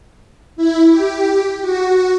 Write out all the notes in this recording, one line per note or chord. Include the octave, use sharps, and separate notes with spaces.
E4
G4
F#4